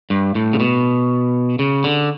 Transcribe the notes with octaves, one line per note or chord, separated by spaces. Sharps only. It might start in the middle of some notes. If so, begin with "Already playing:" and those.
G2
A2
C#3
B2
C#3
D3